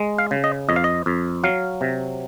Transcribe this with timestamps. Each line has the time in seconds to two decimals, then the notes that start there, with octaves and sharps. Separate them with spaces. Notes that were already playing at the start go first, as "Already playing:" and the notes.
Already playing: G#3
0.18 F5
0.31 C#3
0.44 D#5
0.69 F2 D#5
0.76 F5
0.84 D#5
1.06 F2
1.44 F#3 F5
1.81 C3